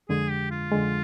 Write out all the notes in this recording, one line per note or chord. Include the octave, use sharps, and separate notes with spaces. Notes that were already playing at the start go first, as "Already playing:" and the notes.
F2 D3 G#3 G#4
G4
F4
F2 D3 G#3